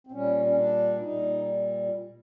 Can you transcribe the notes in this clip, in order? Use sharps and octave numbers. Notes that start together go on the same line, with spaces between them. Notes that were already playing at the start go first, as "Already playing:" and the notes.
C4
A#2 G3 C#4
C#4
D4
A#2 G3 D#4